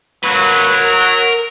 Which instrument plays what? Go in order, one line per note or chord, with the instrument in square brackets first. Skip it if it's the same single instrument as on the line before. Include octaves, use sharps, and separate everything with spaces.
[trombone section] F#3 [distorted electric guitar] A#3 B4
[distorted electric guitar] A#4